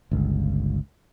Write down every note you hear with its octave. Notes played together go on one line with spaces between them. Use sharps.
G1 C#2